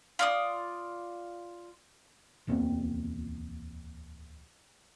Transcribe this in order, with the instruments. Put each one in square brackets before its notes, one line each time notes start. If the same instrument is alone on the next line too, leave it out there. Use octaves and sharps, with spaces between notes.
[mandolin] F4 D5 D#6
[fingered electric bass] D1 E2 A#3 C4